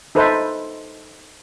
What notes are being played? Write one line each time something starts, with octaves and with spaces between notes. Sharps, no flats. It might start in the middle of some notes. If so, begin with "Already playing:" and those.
D#4 A4 B4 C5 E5